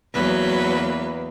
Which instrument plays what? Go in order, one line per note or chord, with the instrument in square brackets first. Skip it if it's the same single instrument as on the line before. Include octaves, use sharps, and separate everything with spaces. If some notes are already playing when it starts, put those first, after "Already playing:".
[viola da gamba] E2 A#3 [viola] F#3 B4